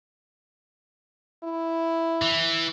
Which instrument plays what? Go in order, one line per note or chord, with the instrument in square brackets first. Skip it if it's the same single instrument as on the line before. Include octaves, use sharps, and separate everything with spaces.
[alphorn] E4
[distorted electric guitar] E3